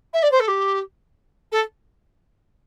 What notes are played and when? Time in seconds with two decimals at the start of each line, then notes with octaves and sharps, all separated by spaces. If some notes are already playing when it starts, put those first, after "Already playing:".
0.13 E5
0.22 D5
0.31 C5
0.40 A4
0.48 G4
1.52 A4